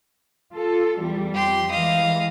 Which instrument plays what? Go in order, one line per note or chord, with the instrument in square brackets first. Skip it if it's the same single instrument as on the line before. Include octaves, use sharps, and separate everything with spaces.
[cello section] F4 A4
E2 G3
[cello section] F2 [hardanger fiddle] G4 C6
[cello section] E3 G#3 [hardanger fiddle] D#5 F5